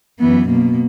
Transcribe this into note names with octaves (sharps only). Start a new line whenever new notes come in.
F#2 E3 B3
B2 A#3